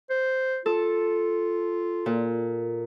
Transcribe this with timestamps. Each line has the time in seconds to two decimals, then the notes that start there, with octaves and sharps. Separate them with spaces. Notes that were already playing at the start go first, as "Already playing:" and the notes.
0.10 C5
0.66 F4 A4
2.06 A#2